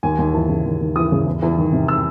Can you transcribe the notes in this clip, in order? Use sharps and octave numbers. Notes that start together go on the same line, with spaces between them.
D#2 G#5
D#2
E3 A5
C#3
D#2
D#2
E3 D#6
C#3
E2
E2
D#3
C3
E6